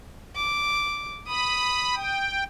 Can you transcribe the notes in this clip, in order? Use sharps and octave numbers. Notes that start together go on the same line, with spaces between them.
D6
B5 D#6
G5